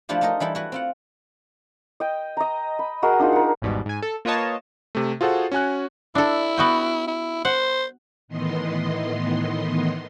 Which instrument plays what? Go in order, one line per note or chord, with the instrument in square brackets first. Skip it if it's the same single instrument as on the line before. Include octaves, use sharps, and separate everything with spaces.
[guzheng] F3 A3 D4 E4 F4 G4
A3 D#4 A4 A#4 D#5
E3 G3 E4 A4
E4 F#4 B4
C4 F4 F#5
[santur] D#5 G5
D#5 A#5
B5
F#4 G#4 A#4 D#5
D4 D#4 F4 G#4
A#4 F#5
[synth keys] G#1 E2 G#2 B2 G3
G#2 G#5
A4
A#3 F4 B4 C#5 D#5 A5
[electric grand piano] C3 A3
F4 F#4 G#4 A4 C5 F#5
C#4 F#4 G#5 F#6
[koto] D4 A4 [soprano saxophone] E4
[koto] B3 F#4 G5
[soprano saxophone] E4
[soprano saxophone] C5 [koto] F#5
[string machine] A2 D#3 E3 B3 D#5 C6